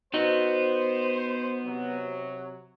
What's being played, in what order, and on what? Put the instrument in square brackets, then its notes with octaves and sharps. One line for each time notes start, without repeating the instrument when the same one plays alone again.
[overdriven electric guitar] B3 [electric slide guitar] D#4 F#4 D#5 [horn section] C5
[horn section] C3 F#3